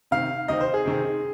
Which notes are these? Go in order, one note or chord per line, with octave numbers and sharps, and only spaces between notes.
C3 D#3 C4 F5
C3 D#3 C4 D#5
C5
G#4
C3 D#3 C4